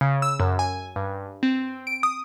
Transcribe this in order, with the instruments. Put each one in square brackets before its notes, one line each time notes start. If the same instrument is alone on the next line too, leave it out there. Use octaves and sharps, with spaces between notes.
[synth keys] C#3
E6
F#2
G#5
G2
C4
D7
D#6